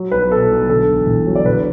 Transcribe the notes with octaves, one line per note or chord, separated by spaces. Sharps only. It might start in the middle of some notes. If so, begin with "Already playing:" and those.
Already playing: F#3
B1 B4
B2 A4
B1
D3 A4
E1
E2
F#3
D5
D3 B4